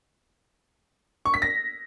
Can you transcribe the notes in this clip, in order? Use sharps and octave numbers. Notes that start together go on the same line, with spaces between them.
C#6
B6
A#6